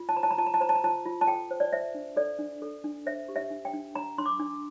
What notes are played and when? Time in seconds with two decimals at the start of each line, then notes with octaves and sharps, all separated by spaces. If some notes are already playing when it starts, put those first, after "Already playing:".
Already playing: F4
0.09 A5
0.16 C5 A#5
0.23 A5
0.31 A#5
0.38 F4 A5
0.46 A#5
0.54 A5
0.60 C5 A#5
0.69 A5
0.75 A#5
0.84 F4 A5
1.06 F4
1.21 A5
1.27 A4 G5
1.51 C5
1.60 D5
1.73 C5 E5
1.95 D4
2.17 A4 D5
2.39 D4
2.62 A4
2.84 D4
3.06 C5 E5
3.28 G4
3.36 E5
3.50 D4
3.65 G5
3.74 D4
3.95 D4 A#5
4.18 D4 C6
4.26 D6
4.39 D4